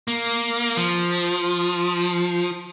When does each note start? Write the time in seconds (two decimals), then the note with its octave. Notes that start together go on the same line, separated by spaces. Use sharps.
0.08 A#3
0.77 F3